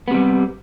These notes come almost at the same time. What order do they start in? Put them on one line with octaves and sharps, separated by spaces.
B3 C3 G3